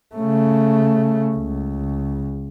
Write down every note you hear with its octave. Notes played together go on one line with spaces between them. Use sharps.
C#3 A3
C#2